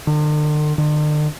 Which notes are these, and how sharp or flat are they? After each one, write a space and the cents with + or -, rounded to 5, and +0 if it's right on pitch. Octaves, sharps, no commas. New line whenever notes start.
D3 +45
D3 +45